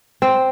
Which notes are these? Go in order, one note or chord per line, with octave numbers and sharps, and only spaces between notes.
C4